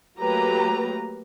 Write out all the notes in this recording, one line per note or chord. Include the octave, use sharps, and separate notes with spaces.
F#3 A3 A#3 G4 B4 A#5